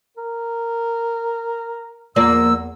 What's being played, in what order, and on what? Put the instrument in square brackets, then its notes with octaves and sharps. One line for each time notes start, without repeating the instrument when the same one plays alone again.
[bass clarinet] A#4
[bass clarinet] E2 [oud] F3 A#3 D5 [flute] E6